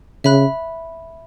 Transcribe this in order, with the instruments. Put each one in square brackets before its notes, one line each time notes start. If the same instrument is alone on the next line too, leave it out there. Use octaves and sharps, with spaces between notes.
[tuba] C#3 [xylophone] E5 B5 F#6